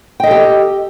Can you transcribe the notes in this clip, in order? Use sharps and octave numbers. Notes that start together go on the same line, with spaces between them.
G4 A4 D#5 G5